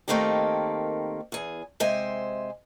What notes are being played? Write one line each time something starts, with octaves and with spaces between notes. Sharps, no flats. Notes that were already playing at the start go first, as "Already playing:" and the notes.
D#3 A3 A#3 C4 D#4 G4
E2 G#4
C3 G#3 C5 E5 G#5